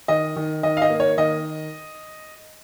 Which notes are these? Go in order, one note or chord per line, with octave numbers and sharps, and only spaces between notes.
D#3 D#5
D#3
D#3 D#5
F5
D#5
A#3
C#5
D#3 D#5